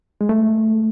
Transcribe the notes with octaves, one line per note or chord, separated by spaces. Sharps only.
G#3
A3